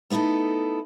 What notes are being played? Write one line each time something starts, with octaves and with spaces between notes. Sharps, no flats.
A3 B3 D#4 E4 A4